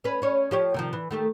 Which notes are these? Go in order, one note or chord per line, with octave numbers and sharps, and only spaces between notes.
C#4 B4
C#4 C#5
F3 G4 C#5
C3 D#3 F3
E3
D#3 A3 G4